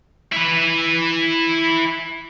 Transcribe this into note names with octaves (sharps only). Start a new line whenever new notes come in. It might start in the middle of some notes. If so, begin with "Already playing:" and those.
E4 B4